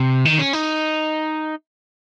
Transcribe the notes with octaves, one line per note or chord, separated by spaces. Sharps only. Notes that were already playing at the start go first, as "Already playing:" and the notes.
Already playing: C3
D#3
C#4
D#4